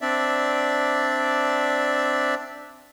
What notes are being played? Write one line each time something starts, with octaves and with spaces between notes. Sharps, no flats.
C4 D4 D5 E5